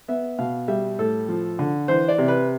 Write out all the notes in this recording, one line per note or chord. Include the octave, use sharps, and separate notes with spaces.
B3 E5
B2 F5
G3 E5
A2 A4
F3
D3
E3 C5
D5
C3
B4